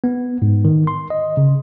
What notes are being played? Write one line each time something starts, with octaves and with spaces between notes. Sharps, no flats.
B3
G#2
D#3
C6
D#5
C#3